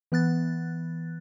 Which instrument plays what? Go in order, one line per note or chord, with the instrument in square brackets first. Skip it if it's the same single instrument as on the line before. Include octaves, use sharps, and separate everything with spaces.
[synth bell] E3 B3 F#6 A6